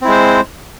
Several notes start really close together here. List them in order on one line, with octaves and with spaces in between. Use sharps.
C4 E4 G#3 C5